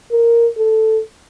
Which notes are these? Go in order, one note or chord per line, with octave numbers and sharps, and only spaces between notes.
A#4
A4